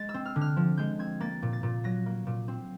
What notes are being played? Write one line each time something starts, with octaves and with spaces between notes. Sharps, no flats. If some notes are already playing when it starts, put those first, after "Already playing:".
Already playing: G#3 A6
E6
C4
F6
D3
F6
F3
G#3 G6
C4 G#6
A#3 A6
A#2
A6
A#2
F#3 A#6
A#3
A#2
C4